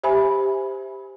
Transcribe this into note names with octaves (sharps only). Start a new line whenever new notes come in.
G4 C5 E5 G#5 B5